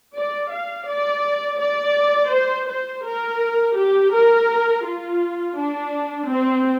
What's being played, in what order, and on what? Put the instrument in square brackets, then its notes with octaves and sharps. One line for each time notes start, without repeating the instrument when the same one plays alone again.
[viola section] D5
F5
D5
D5
C5
C5
A#4
G4
A#4
F4
D4
C4